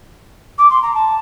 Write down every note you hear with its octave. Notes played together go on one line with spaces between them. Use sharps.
D6
C6
A#5
A5